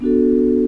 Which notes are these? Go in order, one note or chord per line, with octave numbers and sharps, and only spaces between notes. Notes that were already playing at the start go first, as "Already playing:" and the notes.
B3 D4 F#4 A4